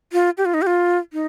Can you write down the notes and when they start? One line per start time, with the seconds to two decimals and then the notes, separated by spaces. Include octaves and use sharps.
0.13 F4
0.38 G4
0.45 F4
0.54 D#4
0.62 G4
0.67 F4
1.13 D#4